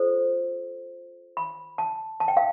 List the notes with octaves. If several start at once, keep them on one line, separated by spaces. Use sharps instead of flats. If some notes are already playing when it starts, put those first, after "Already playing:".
Already playing: F4 A4 C5
B5
A5
A5
G5
F5